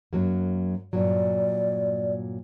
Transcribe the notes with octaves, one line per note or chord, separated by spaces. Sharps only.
F#2 F#3 A#3
G2 A#2 F#3 D5